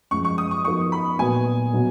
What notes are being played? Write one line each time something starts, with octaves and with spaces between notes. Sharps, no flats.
F#2 F3 G#3 C#6
C#6
D#6
C#6
F3 B3 D#4 F#4 A#4 C#6
B5
A#2 F#3 B3 F#4 B4 G#5
B2 F#3 B3